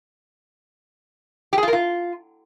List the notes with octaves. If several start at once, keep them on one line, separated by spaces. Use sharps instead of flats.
G4
G#4
F4
A#4
F4